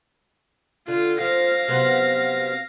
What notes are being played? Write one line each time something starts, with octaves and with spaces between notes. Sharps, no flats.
D3 F4
F3 F5 A#6
C3 F#3 B3